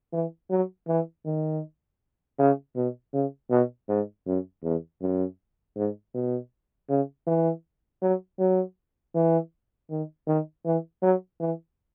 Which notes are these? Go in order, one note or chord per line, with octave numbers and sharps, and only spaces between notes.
E3
F#3
E3
D#3
C#3
B2
C#3
B2
G#2
F#2
E2
F#2
G#2
B2
C#3
E3
F#3
F#3
E3
D#3
D#3
E3
F#3
E3